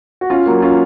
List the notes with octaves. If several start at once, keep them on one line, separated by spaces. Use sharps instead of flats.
F#4
C#4 F4
F#3 A#3
C#4 F4